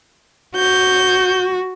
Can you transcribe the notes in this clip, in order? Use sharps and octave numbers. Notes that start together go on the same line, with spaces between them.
F#4 G6